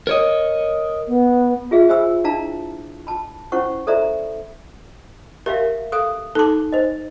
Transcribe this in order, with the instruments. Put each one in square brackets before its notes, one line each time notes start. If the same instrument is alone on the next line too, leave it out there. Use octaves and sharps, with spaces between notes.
[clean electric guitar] A#4 C#5 D#5
[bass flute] B3
[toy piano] F4 G#4 E5 F5
G4 C5 E5 G#5 B5 E6
D4 E4 F5 A5 A#5
A5 B5
C#4 E4 C5 F#5 C#6
A4 C5 D5 E5 A#5 B5
[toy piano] G4 E5 F5 [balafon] A#4
[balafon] A4 F5 [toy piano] D#6
[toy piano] D#4 D6 [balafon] A4 A5
[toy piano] C5 D#5